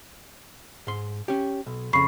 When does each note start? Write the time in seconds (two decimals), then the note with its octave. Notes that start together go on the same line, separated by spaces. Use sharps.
0.87 G#2 C6
1.28 C#4 G4
1.66 B1
1.93 F2 C#3 B5 C#6 C7